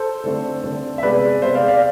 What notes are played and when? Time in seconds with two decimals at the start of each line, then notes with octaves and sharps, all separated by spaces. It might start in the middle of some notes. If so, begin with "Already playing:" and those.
Already playing: A4 C5
0.24 D3 A3 C4
0.64 D3 A3 C4
0.98 E5
1.03 C3 G#3 B3 B4 D5
1.42 C3 G#3 B3 C5 E5
1.55 D5 F5
1.68 D5 F5